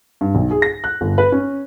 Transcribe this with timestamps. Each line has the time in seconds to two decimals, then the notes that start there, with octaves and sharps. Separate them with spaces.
0.21 G2
0.35 B1
0.51 G#4
0.62 A#6
0.84 F#6
1.01 G1
1.18 B4
1.32 C#4